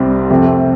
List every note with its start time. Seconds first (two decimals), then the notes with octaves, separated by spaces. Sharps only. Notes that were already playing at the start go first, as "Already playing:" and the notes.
Already playing: C2 C3 G3 C4
0.30 F2 C3 A3 C4